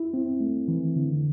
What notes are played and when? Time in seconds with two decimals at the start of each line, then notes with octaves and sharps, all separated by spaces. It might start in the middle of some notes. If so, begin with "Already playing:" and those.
Already playing: E4
0.14 C4
0.40 A3
0.68 E3
0.96 D3